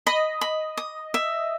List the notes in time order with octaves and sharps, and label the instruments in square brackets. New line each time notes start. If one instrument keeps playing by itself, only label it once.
[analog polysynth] D#5 [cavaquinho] B5
[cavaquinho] B5
D#6
E5